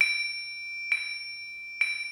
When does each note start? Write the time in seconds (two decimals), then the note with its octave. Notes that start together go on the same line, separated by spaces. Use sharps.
0.01 D7
0.92 D7
1.81 D7